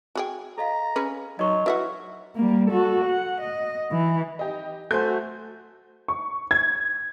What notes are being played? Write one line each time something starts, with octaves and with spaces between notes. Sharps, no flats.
F#4 G#4 G5
A4 D#5 F5 A#5
C#4 G#4 B4
F#3 D#4 F#4 A#4 D#5 C#6
E4 F#4 B4 E5 F#5
G3 A#3
F#4 A4
F#5
D#5
E3
D#4 G4 D#5
A3 F#4 A4 C5 G#5 C6 G6
C#6
G#6